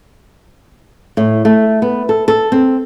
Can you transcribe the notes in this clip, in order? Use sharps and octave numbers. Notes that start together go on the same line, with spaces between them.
A2
A3
B3
A4
A4
C4